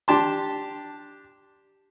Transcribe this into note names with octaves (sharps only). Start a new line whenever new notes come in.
D4 G4 A5 C6